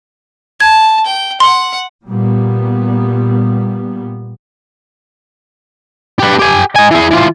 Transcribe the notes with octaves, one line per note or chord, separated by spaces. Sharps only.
A5 G#6
G5
F#5 C6
A#2 G3 B3
G4 B4
G4 G#5
D#4 G#5
E3 G#4
E3 F4